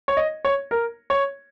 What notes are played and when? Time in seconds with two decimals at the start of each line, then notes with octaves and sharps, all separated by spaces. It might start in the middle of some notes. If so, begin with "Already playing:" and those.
0.08 C#5
0.17 D#5
0.45 C#5
0.71 A#4
1.10 C#5